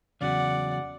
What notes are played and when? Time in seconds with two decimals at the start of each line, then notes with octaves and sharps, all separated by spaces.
0.21 E2 C#3 F#3 D5 F#5